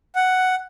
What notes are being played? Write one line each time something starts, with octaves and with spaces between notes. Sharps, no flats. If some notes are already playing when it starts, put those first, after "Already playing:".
F#5